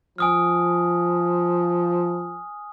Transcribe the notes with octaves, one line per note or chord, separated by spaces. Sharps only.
F3 G#5 D#6 F6